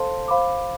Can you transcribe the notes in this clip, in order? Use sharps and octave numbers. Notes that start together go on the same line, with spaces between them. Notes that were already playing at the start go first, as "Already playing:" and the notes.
Already playing: A4 C5 F5 A5 C6
C5 F5 B5 D6